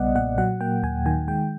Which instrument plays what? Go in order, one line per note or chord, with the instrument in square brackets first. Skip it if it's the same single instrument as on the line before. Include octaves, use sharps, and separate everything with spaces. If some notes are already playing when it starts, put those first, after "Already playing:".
Already playing: [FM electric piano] B1 C#3 G3 B3 D5 D#5 F#5
A#2 F#5
F#3 F#5
A#3 G5
D#2 G#5
D#3 G#5
G#3 G5